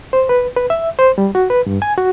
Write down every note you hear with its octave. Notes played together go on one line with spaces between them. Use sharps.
C5
B4
B4
E5
C5
G3
F#4
B4
G2
G#5
F#4